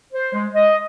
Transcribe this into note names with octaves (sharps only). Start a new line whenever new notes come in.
C5
G#3
D#5